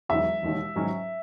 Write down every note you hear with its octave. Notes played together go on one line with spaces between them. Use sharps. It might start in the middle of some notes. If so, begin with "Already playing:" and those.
E1 E2 D#3 F#3 E5
E1 D#2 D#3
G#2 D#3 F#3 C#4